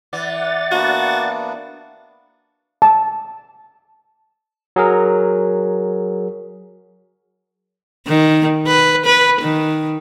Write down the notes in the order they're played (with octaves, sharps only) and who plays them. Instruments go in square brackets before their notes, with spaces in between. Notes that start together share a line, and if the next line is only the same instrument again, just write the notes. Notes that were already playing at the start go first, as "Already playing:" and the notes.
[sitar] E3 [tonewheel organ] D5 F#5 A6
[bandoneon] A#3 B3 D4 [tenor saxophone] F#4
[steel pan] A5
[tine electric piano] F#3 G#4 A#4
[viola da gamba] D#3
B4
B4
D#3